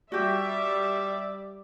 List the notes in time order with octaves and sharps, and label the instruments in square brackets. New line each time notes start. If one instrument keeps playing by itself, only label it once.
[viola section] G3 E5 [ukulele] F#4 G4 [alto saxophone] D5